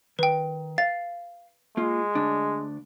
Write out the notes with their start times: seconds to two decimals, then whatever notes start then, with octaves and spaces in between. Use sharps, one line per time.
0.19 D#3 B4 G5
0.78 F5 A6
1.77 G#3 A#3 F4
2.15 D2 D4